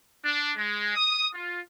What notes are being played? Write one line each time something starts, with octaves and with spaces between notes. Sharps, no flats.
D4
G#3
D#6
F4